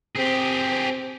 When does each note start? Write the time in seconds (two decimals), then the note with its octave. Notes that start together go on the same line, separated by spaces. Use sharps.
0.16 C4 G4 G#4